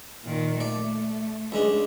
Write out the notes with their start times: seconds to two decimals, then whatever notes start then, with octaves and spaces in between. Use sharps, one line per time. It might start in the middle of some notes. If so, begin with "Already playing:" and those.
0.24 A#2 D#3
0.60 A3 D5
1.52 C#2 G#3 D4